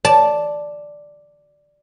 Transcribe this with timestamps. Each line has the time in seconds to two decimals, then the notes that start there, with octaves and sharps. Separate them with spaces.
0.05 D5 A5